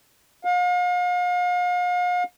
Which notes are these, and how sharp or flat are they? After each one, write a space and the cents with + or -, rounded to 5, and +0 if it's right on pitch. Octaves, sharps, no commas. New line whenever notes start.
F5 +40